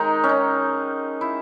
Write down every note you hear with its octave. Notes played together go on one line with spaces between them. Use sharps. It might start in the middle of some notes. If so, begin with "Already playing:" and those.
Already playing: D#3 G#3 D#4
C#4
D#4
E4